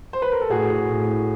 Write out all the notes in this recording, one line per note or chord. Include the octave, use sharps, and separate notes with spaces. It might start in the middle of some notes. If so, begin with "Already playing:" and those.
C5
B4
A#4
A4
A2 F#4 G#4
A2